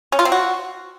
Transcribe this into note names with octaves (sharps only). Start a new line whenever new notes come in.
C#4
F4
C4
F#4